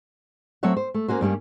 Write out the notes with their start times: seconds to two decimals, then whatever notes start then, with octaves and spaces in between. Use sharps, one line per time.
0.63 F#3 A3 C4 C#5 E5 F#5
0.77 C5
0.94 A3
1.08 A#3 C#4 F#4 C5
1.21 G2 G3 A#3 C#4